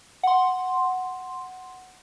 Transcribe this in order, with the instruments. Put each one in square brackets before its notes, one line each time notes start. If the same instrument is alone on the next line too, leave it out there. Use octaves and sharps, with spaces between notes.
[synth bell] F#5 C6